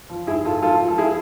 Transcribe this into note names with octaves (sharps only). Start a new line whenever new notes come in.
F3
G#2 E4 G#4
G#2 F4 A4
F3 F4 A4
F3
A4
E4 G#4